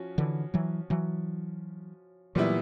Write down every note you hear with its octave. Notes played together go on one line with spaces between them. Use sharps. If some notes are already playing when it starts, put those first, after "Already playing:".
Already playing: F3 C#4 F#4
D3 E3
E3 F#3
E3 F#3
A#2 E3 F#3 G3 B3 E4